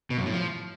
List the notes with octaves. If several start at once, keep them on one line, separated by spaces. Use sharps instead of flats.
B2
F#2
A2
F3